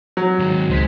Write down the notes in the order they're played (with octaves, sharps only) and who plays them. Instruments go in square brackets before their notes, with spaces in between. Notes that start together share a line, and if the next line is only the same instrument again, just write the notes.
[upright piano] F#3
[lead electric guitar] G#2 D#3
[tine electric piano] C#2 C5 B6 [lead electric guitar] G#3